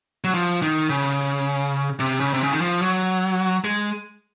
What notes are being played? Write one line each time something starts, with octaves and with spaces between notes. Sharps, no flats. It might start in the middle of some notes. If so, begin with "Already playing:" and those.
F#3
F3
D#3
C#3
C3
C#3
C3
C#3
D#3
F3
F#3
G#3